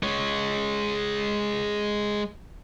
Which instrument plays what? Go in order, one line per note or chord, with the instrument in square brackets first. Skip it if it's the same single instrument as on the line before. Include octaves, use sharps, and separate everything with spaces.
[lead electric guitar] G#3 C#5